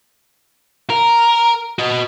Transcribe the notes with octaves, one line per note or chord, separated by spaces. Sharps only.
A#4
F#4 D#5